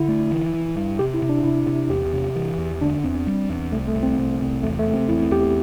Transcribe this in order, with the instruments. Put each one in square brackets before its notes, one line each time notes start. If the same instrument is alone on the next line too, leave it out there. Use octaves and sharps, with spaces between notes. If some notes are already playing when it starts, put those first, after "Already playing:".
Already playing: [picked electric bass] D3 [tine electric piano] E4
[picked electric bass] A3
E3
E3
G2
[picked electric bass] C3 [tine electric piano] G4
[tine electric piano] E4
[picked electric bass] C3
[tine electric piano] D4
[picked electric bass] C3 [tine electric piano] E4
[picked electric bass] C3
[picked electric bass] E2 [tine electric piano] G4
[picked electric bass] C3
E3
E2
[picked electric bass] D3 [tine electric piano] D4
[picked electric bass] E2 [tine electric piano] C4
[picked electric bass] G3
E2
[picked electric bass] C2 [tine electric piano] A3
[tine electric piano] A3
[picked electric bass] C2
[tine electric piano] C4
[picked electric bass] C2
C2
[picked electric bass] E2 [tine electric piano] A3
[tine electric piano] A3
[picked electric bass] C3
[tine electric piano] C4
[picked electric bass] E2 [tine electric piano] E4
[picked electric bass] E2 [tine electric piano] G4